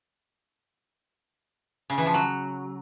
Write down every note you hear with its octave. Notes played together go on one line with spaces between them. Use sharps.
C#3
E3
F3
F#3